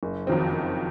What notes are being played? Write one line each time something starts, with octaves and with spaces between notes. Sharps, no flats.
F#1
F2 D#3 F#3 C4
F#1